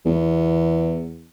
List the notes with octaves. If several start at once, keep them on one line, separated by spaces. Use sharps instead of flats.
E2